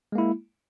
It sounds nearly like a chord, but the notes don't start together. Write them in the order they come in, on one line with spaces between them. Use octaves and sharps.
G#3 A#3 E4